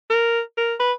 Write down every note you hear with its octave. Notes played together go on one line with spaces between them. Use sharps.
A#4
A#4
B4